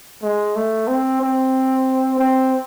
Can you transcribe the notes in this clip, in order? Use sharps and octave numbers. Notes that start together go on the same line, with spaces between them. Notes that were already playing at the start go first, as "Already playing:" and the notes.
G#3
A3
C4
C4
C4